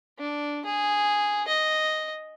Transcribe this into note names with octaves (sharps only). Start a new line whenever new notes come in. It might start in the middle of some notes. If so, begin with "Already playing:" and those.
D4
G#4
D#5